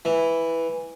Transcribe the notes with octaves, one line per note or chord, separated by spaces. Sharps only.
E3